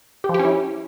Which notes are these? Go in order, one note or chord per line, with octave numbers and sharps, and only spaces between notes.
G4
F3
G4
C#4
E4